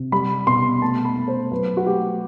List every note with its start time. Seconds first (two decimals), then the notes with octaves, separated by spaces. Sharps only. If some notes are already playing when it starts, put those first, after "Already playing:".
Already playing: C3
0.12 G3 B5
0.47 B2 C6
0.82 A3 A5
1.05 B5
1.17 A3
1.28 C5
1.51 F#3 B4
1.77 F#4
1.86 A3 G4